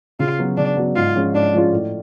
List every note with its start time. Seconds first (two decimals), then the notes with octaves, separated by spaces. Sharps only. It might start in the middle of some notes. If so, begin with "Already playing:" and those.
0.19 C#3 F4
0.39 F#3 B3 F#4
0.57 C#3 D4
0.77 F#3 B3 F#4
0.95 G#2 F4
1.15 F3 G#3 C#4 F4
1.34 G#2 D4
1.54 F3 G#3 C#4 F4
1.72 A2